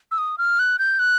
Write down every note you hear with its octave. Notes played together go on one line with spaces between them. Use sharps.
E6
D#6
F6
F#6
G6
F#6